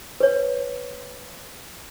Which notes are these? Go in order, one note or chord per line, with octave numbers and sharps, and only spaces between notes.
B4 C#5